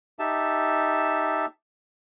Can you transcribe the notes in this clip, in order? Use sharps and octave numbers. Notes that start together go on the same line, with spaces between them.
D#4 G4 E5 A5